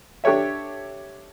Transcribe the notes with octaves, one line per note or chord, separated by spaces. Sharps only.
D4 G4 A4 C#5 E5